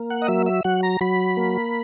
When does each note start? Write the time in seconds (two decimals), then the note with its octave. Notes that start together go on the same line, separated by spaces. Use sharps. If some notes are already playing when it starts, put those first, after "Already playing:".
Already playing: A#3
0.10 F#5
0.22 D#5
0.28 F#3 E5
0.46 E5
0.64 F#3 F#5
0.83 A#5
1.01 F#3 B5
1.37 A#3